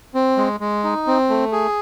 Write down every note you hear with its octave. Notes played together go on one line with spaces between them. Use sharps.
C4
G#3
G#3
D#4
C4
A3
G#4